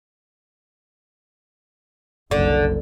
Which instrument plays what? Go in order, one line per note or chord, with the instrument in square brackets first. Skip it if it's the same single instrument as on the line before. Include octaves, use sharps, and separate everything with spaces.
[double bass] F#1 C2 [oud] D3